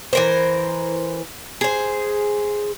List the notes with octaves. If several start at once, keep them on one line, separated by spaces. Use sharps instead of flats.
E3 A#4 C5
G#4 C5